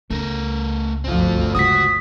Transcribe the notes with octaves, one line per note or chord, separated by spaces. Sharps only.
C#2 A3 A#4
G1 D2 F3 C4 F4
C#3 G#3 F#4 D#6 B6